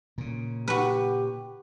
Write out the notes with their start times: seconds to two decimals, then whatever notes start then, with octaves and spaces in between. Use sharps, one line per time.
0.18 A#2 C#3
0.68 F#4 G4 B4